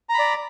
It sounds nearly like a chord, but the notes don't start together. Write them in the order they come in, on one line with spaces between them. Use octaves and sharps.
A#5 B5 D5